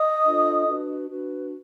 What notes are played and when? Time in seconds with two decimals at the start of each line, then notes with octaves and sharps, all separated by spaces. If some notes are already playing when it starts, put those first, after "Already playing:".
Already playing: D#5 D#6
0.25 D4 F4 A4 C5
0.68 D4 F#4 B4
1.09 D4 F#4 B4